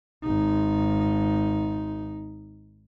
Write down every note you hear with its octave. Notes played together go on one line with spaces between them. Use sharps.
G#1 D#4